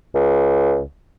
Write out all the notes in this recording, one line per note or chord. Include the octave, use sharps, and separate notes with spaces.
C#2